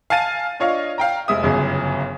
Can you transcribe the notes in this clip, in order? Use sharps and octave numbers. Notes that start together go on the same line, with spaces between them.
F5 G#5 A5 A6 D#7
D4 F4 C#5 D#5 F5
F5 G5 A#5
F1 G#3 E5 D#6
G1 F#2 C#3 G#4